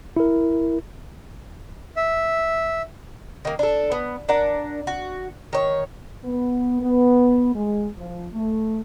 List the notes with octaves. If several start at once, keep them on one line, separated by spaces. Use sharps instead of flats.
E4 A#4
E5
D#3 A#3
D4 A4
B3
D4 A#4 F#5
F#4
D#3 C#5
B3
B3
G#3
F3
A3